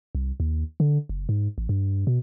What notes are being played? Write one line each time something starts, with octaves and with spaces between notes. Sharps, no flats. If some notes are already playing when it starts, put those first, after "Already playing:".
C2
D#2
D3
F#1
G#2
A1
G2
B2